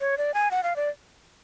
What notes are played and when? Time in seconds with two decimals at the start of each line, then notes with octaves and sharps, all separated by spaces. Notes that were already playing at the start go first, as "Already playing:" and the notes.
0.01 C#5
0.18 D5
0.34 G#5
0.51 F#5
0.63 F5
0.76 D5